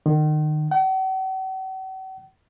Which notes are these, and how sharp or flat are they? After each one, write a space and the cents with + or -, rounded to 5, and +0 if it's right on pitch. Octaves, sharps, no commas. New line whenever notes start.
D#3 -35
F#5 +45